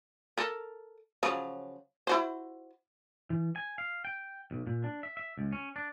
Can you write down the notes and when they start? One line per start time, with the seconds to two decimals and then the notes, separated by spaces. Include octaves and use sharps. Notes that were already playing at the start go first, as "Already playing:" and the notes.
0.38 A4 A#4
1.23 C#3 F3 F#3
2.07 E4 F#4 C5
3.30 E3
3.56 G#5
3.78 F5
4.05 G5
4.51 B1
4.67 A#2
4.84 D4
5.03 E5
5.17 E5
5.38 C#2
5.52 C#4
5.76 D4